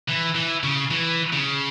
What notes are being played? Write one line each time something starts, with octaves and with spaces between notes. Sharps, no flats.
E3
E3
C#3
E3
C#3